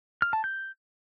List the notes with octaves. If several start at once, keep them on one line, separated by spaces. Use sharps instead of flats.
F6
A5
G6